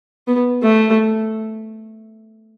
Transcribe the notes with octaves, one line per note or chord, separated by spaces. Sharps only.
B3
A3